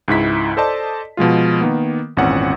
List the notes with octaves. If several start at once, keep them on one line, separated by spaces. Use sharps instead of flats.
C#2 G#2 E4 B6
A4 C5 D5 D#5 A5
B2 F3 G#3 F4
D#3 A#3 B3
G#1 E2 A#2 C4 C#4 F#5